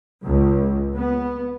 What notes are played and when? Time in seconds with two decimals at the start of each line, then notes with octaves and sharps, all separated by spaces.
0.25 C#2
0.93 B3